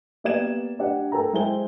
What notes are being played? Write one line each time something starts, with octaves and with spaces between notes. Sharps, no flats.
A#3 B3 G4 D5 G#6 E7
D4 G4 D5 F#5
A4 A#4 G5 A#5
G#3 E4 C5 G5 G7